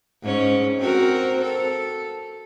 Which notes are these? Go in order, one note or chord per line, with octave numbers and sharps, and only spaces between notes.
G#2 C#4
C4 F#4 A#4
A4